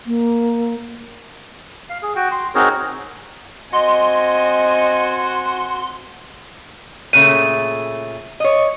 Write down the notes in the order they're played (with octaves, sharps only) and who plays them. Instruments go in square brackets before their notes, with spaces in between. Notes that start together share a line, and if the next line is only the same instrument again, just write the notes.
[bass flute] A#3
[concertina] F5
G#4
F#4 G5
C6
C4 D#4 F#4 G#4 A#4 C#5
[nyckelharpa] C4 G#5 [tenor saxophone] F#4 [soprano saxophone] D#5 [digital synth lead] C6
[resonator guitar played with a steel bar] A#2 C#3 A3 [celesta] D#7
[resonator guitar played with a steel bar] C#5 D#5